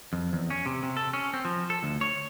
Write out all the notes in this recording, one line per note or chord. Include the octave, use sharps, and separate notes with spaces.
F2
E2
C#4
C3
C3
A4
C#4
C4
F3
A4
D2
C#5